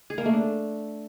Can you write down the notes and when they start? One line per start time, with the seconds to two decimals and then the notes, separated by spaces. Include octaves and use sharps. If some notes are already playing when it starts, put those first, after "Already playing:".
0.10 G#4
0.18 A#3
0.26 A3
0.33 D4